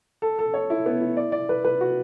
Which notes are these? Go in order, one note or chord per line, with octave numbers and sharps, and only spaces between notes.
A4
A4
C#5
E4
B3
E4
D5
D5
B4
B4
F#4